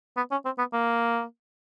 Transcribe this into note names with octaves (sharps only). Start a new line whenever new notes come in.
B3
C#4
C4
B3
A#3